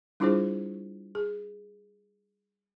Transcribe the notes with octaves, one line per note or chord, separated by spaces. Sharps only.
G3 D4 E4 F4 G#4 C5
G#4